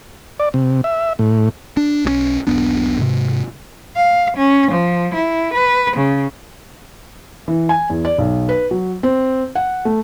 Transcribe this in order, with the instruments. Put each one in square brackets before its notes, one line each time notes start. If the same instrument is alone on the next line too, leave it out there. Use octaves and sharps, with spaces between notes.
[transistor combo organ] D5
C3
E5
A2
[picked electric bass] D4
B1 F3 C#4
E1 B1 B3 D4
G#2 C3
[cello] F5
C#4
F3
E4
B4
C#3
[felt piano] E3
G#5
E2
D5
B1
B4
F#3
C4
F#5
A3